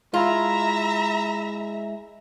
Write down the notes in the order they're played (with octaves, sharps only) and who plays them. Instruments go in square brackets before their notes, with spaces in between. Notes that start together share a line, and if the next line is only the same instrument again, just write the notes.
[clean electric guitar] G#3 E4 [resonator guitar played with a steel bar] F4 [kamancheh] E5 A#5